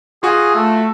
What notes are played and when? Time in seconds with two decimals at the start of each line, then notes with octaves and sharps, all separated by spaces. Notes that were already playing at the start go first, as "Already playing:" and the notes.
0.23 F4 F#4 G#4
0.54 A3